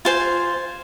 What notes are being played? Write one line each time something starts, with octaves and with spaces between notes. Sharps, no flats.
F4 C5 G#5